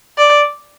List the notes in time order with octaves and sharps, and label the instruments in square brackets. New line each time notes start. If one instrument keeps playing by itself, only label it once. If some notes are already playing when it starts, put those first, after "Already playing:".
[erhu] D5